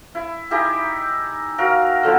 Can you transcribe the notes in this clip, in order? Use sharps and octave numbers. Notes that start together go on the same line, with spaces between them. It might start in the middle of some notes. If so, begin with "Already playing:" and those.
E4
D#4 E4 G4 G#4
F#4 A#4 F5
D3 F3 B3